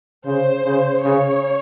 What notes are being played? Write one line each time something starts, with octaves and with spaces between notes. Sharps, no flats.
C#3 C5
C#3
C#3 C#5